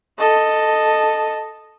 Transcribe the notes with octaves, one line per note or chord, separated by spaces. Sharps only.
A4 D#5